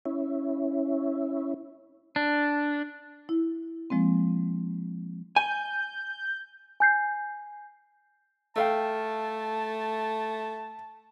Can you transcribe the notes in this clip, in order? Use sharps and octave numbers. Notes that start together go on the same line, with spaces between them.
C#4 E4
D4
E4
F3 G#3 A#3 C4
G#5 G6
G#5 G6 C7
A3 A4 F5 G5 A5